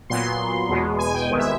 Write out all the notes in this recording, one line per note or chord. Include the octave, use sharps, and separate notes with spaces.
A#2 F#3 B3 C6
E2 B2 G#3 B3
G#5
G5
C2 C3 D#3 G#3 B3
E5